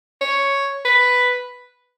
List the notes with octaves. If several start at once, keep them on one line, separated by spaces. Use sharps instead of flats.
C#5
B4